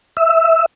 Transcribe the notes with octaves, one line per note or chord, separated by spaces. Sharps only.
E5